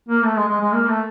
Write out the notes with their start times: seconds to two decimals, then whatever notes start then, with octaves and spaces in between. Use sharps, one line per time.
0.09 A#3
0.24 A3
0.37 G#3
0.48 G#3
0.60 G#3
0.73 A#3
0.89 A3